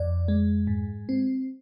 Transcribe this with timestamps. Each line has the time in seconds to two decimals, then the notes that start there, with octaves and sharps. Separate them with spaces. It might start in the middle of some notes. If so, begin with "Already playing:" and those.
Already playing: F2 D5
0.28 G#3
0.67 G#2
1.09 C4